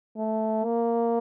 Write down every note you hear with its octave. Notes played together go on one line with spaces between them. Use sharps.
A3
A#3